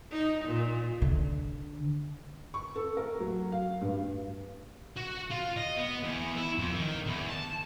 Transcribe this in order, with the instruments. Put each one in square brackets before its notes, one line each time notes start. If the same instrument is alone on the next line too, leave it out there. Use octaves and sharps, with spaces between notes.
[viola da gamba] D#4
A#2
[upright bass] D3
[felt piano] C#6
A4
A#4
F#3
F5
G2
[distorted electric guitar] F#4
F4
D#5
B3
E2
E4
F2
D#3
E2
A5